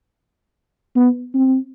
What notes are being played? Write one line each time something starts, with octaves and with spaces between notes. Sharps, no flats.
B3
C4